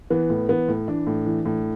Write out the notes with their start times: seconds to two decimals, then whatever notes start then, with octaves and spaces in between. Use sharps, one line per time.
0.10 E3 B3
0.30 A2
0.49 E3 B3
0.68 A2
0.88 E3 D4
1.07 A2
1.26 E3
1.46 A2